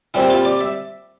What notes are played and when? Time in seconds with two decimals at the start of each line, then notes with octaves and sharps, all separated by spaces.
0.14 A#2 G3 C4 E4
0.30 F4
0.45 D5
0.61 E5